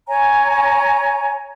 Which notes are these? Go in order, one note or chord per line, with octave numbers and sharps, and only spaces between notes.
C#5 G#5 A#5